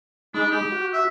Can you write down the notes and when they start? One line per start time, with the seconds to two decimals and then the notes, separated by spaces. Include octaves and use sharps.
0.34 G#3 D4 D#4 B5
0.51 G4
0.72 F#4
0.93 E5